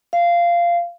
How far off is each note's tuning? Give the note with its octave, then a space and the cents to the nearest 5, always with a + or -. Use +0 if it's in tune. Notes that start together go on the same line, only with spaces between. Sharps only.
F5 -15